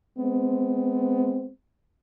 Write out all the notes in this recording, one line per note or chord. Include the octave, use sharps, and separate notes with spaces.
G#3 B3 C4